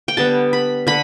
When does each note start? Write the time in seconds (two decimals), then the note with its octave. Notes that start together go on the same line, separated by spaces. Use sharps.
0.08 G5
0.17 D3 G3 B3 A5
0.53 B5
0.87 D3 B5